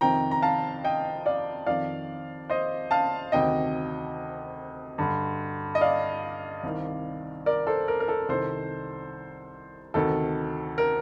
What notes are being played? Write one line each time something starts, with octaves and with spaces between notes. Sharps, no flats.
F2 C3 D#3 G5 A#5
A#5
F5 A5
D#5 G5
D5 F5
F2 D#3 D5 F5
C5 D#5
F5 A5
D2 C3 D#3 D#5 G5
G2 D3
D#5
D5 F5
C2 C3 D#3
A#4 D5
A4 C5
A#4
A#4
A4
C2 C3 D#3 A4 C5
D2 C3 D#3 A4
A#4